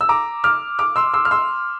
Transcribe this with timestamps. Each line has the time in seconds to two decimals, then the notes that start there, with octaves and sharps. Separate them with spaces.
0.01 E6
0.09 A#5 D6
0.44 D6 F6
0.79 D6 F6
0.96 C6 E6
1.14 C6 E6
1.25 F6
1.31 C6 E6